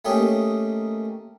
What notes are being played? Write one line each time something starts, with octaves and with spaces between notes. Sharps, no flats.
A3 A#3 C#4 D#4 G4